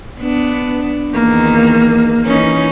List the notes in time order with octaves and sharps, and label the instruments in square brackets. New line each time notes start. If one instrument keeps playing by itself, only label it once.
[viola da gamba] B3 D4
[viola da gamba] E2 D#3 [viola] A#3
[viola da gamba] E3 C#4 D#4